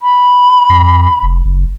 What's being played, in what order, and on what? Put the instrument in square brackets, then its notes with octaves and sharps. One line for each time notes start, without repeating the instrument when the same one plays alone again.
[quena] B5
[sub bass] F2
F1
F#1